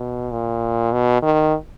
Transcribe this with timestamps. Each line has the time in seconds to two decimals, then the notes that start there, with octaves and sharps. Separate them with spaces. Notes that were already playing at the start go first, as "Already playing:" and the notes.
Already playing: B2
0.31 A#2
0.93 B2
1.22 D#3